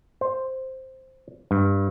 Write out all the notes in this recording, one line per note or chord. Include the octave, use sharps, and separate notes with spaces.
C5
G2